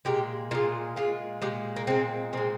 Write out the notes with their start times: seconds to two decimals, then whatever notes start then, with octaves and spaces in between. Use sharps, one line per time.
0.05 A#2 G#3 G4
0.51 A#2 G#3 F4
0.96 A#2 G#3 F4
1.42 A#2 G#3 G4
1.76 A#3
1.87 A#2 G#3 C4
2.33 A#2 G#3 C4